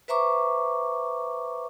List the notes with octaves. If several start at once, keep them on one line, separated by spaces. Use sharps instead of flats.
B4 C5 E5 A#5 C#6 D6